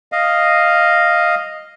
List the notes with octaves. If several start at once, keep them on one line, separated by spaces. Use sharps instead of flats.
D#5 F5